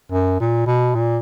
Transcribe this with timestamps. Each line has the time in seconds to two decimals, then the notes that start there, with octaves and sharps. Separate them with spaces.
0.12 F#2
0.40 A#2
0.66 B2
0.95 A#2